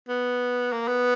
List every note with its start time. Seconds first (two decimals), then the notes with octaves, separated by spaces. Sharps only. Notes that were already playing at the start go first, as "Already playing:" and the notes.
0.09 B3
0.73 A#3
0.88 B3